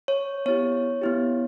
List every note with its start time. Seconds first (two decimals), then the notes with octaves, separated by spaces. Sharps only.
0.08 C#5
0.46 B3 E4 G4 C#5
1.02 B3 E4 G4